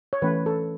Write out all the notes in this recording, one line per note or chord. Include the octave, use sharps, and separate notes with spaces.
C#5
E3 A3 C#4 B4
A4